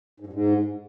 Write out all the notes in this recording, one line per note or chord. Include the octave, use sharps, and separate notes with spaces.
G#2
G2
G#2